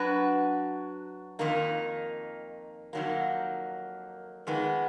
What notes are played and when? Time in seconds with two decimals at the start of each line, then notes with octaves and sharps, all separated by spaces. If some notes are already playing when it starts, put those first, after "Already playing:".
Already playing: F#3 D4 F#4 B4
1.39 F2 D#3 A#3 D#4
2.93 F2 D#3 F#3 A#3
4.47 F2 D#3 G#3 B3